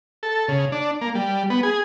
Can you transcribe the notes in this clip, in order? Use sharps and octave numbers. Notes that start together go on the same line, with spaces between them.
A4
C#3
D4
A#3
G3
B3
G#4